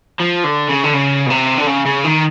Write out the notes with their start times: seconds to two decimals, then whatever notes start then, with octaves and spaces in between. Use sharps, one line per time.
0.19 F3
0.44 D3
0.68 C#3
0.83 D3
0.93 C#3
1.26 B2
1.30 C3
1.58 D3
1.67 C#3
1.86 C#3
2.04 D#3